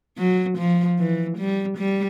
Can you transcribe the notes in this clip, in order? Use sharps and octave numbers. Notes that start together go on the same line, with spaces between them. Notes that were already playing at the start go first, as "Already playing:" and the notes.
F#3
F3
E3
G3
G3